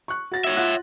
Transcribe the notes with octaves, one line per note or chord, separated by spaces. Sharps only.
C#6 F#6
F#4 A6 A#6
C#5 E5
F4 F#5 F#6